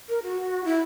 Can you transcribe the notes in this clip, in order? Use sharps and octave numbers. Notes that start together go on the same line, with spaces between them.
A#4
F#4
E4